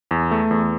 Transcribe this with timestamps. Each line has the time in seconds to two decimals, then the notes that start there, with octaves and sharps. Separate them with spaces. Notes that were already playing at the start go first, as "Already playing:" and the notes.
0.11 E2
0.31 A3
0.51 E2